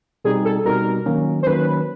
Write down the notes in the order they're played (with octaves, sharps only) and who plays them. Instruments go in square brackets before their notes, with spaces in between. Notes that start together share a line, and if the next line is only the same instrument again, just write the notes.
[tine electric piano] B2 G3 C4 D#4 [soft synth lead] G#4
[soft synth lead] A4
[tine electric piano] B2 G3 C4 D#4 [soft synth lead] A#4
[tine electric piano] D#3 F#3 A#3 C#4
[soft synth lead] C5
[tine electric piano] D#3 F#3 A#3 C#4 [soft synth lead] B4